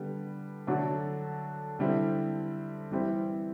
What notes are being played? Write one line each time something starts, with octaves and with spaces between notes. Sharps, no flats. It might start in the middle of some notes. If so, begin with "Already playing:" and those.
Already playing: D3 G3 B3
D3 F#3 A3 D4 F#4
D3 G3 C4 E4
E3 G3 C4 E4